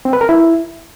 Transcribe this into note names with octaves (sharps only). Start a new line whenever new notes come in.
C4
B4
A#4
E4